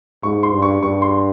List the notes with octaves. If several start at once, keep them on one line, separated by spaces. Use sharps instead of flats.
G#2 C#6
C6
G2
C#6
G2 C#6
C6